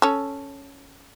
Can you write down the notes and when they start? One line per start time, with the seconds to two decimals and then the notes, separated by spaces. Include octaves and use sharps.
0.02 C#4 A4